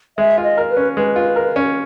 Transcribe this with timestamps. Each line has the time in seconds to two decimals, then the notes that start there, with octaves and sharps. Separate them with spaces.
0.18 G#3 E5
0.38 F4
0.44 D#5
0.57 A#4
0.70 B4
0.77 C#4
0.97 G#3 B4
1.16 F4
1.36 A#4
1.56 C#4